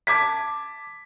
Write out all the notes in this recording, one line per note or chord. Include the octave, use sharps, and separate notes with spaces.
A5 D6 G#6 B6